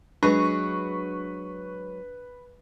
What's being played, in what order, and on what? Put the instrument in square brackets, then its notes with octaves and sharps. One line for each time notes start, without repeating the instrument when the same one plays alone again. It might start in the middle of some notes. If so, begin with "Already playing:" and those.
[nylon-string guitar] F#3 G#3 F#4 [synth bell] D4 [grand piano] B4 [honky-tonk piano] C#6